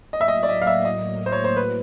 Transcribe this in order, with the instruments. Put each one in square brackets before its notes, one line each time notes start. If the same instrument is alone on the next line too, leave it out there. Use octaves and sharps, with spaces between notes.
[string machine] A2 F#3 A#3 [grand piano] D#5
[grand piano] E5
D#5
D5
D#5
F5
E5
D#5
C5
C#5
C5
B4